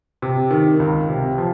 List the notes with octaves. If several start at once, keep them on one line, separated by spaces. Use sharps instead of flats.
C3
D#3
C#2
C3
F3